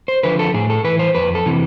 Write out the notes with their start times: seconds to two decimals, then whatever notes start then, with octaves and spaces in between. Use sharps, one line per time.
0.08 C5
0.23 D3 F3 B4
0.39 A4
0.54 A2 G#4
0.70 A4
0.84 E3 B4
0.99 C5
1.15 F2 B4
1.35 A4
1.46 C3 E3